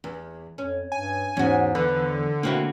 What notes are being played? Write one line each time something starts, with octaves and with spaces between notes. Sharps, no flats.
E2
F2 C#4
G2 G#5
E2 G#2 C#4 F#4
D3 F3 B4
B2 D3 A#3 C4 E4 F#4